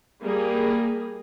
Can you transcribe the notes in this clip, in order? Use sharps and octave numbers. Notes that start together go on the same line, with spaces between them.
G3 A#3 G#4